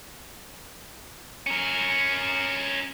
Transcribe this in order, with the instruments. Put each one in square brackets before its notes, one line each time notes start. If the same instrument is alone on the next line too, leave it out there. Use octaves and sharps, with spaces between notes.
[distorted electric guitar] C#4 A#4